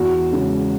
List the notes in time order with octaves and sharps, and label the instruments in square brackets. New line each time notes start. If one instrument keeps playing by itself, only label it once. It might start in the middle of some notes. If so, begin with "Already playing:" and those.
Already playing: [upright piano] E2 F#4
C#3 G#3